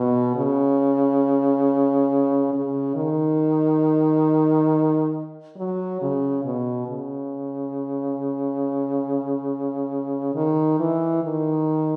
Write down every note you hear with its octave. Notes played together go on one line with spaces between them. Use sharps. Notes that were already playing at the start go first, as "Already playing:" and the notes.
Already playing: B2
C#3
C#3
D#3
F#3
C#3
B2
C#3
D#3
E3
D#3